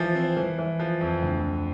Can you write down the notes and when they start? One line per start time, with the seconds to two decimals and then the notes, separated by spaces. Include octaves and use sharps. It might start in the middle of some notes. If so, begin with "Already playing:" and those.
Already playing: E3 F3
0.15 C4
0.36 E3
0.58 E3
0.79 F3
1.01 F2
1.23 D2
1.45 D3